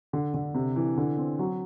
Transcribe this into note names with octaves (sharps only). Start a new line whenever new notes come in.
D3
D3
C3
E3
D3
C4
F#3